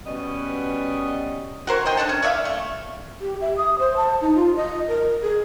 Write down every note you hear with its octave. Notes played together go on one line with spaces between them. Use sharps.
B2 G3 B3 C#4 D#5
F#4 A#4 C5 C#5
C5 D#5 G5
D4 A4 F#5 A5
C#4
C#5 D5 E5 F5
A3
G4
E5
D#6
C5
A5
D#4
F4
D#5
A#4
G#4